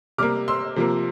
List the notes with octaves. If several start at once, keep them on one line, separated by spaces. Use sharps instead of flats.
C3 G3 A#3 D6 F6
C6 E6
C3 F3 A#3